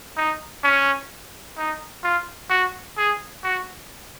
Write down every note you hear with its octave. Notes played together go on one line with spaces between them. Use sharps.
D#4
C#4
D#4
F4
F#4
G#4
F#4